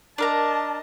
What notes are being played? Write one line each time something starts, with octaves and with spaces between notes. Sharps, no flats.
D4 A#4 D#5 A5 A#5